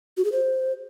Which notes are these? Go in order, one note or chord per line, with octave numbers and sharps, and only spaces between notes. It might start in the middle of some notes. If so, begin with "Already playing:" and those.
F#4
G#4
C5